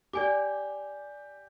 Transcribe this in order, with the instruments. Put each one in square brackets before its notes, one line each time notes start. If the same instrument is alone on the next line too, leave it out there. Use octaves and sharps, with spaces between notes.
[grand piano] G4 [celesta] D5 G#5 D6